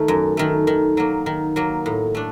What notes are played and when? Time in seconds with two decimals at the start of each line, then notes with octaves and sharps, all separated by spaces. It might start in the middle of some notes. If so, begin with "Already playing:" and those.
Already playing: D#3 A3
0.08 F#2
0.37 D#3 A3
0.67 D#3
0.97 F#3 A#3
1.26 D#3
1.56 F#3 A#3
1.86 A2
2.15 A3 D4